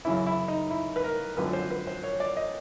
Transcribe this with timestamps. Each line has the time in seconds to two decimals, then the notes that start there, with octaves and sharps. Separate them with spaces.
0.05 F#2 C#3 E3 E4
0.27 E4
0.48 D#4
0.71 E4
0.96 B4
1.04 A#4
1.37 G#1 F#2 D3 F3 B4
1.53 C5
1.70 B4
1.87 C5
2.03 C#5
2.20 D5
2.37 D#5